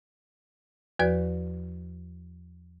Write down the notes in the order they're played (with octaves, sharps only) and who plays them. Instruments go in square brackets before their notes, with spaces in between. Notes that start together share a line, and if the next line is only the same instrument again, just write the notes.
[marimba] E2 F3 F#4 B4 D5